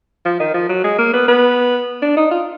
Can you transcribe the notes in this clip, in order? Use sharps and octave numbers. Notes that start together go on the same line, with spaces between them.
F3
D#3
F3
F#3
G#3
A#3
B3
B3
D4
D#4
F4